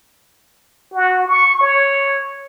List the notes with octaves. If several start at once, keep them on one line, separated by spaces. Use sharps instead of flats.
F#4
C#6
C#5